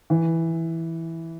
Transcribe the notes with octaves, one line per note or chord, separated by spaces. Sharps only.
E3